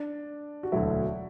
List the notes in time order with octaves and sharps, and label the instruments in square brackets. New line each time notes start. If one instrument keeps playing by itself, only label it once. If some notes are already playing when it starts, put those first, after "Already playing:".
Already playing: [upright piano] D4
F#4
[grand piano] E1 D2 D3 F#3 A3 [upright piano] E4